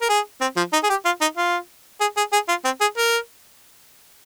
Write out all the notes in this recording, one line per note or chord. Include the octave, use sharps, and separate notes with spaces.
A#4
G#4
C4
F3
D#4
G#4
G4
F4
D#4
F4
G#4
G#4
G#4
F4
C4
G#4
A#4